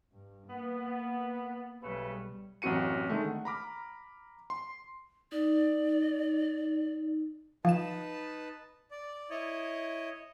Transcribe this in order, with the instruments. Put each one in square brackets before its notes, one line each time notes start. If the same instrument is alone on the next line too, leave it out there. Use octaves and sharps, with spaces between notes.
[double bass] G2
[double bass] A#3 [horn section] B3
[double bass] B1 G3 [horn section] C#3 A3 B4
[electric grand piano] A1 F#2 C4 F#4 C#7 D#7
D3 D#3 G#3 A3
F#5
A#5 B5 D6 F6
C6
[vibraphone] D#4 [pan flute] D5
[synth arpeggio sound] F3 E7 [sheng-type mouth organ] D#4 B4 A5
[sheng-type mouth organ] D5
E4 C#5 D#5